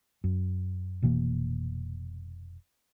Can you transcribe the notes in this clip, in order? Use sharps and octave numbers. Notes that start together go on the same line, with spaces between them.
F#2
F1 B2 E3 A#3